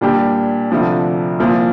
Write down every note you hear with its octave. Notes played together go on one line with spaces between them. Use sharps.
A#2 G3 D4 G4
D2 C3 F3 D4
C2 A#2 F3